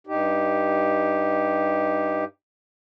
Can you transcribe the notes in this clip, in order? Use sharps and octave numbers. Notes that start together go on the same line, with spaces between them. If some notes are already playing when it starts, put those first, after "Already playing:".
G2 D#4 G4